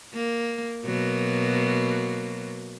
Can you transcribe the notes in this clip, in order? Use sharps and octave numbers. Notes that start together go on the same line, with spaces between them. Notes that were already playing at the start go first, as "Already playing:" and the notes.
A#3
B2 F#3 A#3